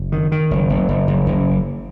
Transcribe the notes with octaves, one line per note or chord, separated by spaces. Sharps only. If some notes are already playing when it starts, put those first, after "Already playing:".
Already playing: F#1
D#3
D#3
F#1
F#1
F#1
F#1
F#1